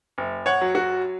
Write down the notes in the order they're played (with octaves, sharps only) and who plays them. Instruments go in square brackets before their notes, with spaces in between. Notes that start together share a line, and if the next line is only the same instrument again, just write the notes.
[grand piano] F#1
C#5 F#5
F#3
F#4